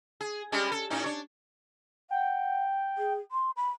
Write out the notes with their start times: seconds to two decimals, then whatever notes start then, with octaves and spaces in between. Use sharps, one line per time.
0.21 G#4
0.52 G3 G#3 C#4
0.72 A4
0.90 A2 C#4 D#4
1.04 D4 C#5
2.11 F#5 G5
2.98 G#4
3.32 C6
3.57 B5